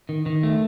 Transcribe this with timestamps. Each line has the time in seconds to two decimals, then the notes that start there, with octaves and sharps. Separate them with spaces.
0.09 D#3
0.26 D#3
0.43 A3